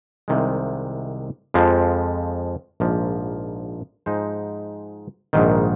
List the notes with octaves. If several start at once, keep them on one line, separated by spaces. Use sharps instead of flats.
C2 C3 D#3 G#3
F2 F3 G#3
A#1 G#2 F3 A#3
G#2 F3 G#3 D#4 C5
A#1 G#2 D#3